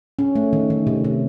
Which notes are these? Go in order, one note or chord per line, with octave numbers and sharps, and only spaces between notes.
C#4
A3
D#3
D#3
C3
C3